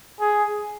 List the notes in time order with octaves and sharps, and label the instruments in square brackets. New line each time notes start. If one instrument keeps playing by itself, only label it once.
[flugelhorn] G#4